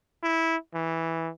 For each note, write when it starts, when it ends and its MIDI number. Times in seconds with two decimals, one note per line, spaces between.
0.23 0.56 64
0.75 1.30 52